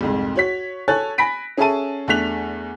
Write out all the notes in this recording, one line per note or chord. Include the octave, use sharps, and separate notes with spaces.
C2 F2 G#2
F#4 C#5 B6
A4 C#5 G#5 F#6 A6
G#5 B5 A#6 B6 D7
C#4 G#4 A4 E5 A5 D#7
E2 A3 D4 F#6 B6 F7